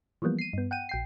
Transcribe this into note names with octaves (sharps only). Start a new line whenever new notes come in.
E3 F3 G3 A#3 B3
C7 D#7
G2 B3
F#5 G5 D#7
A#1 G5 C7